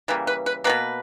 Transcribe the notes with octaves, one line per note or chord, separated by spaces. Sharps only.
C#3 E3 G3 A#3 B4
B4
B4
G3 A#3 B4
B2